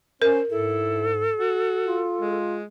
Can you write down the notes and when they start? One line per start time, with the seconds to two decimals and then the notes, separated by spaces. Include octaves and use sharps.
0.22 C#4 A#4 C5
0.50 G#2 E4 A4
1.40 F#4
1.86 F4
2.21 G#3